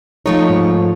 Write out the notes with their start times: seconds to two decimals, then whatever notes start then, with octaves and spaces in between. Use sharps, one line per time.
0.26 F3 A3 D#4 C#5
0.50 G#2